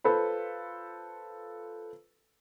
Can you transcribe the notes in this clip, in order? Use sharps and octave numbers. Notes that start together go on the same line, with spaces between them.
F4 A4 B4 C5 B5